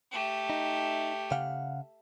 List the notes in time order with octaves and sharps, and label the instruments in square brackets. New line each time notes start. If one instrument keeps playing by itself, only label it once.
[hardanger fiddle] A3 G4
[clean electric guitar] D#4
C#3 F5 F#5